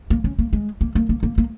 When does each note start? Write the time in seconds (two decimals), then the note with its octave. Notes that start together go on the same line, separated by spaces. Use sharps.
0.10 A#3
0.24 C#4
0.39 A#3
0.53 G#3
0.81 A#3
0.95 A#3
1.09 A#3
1.23 A#3
1.38 A#3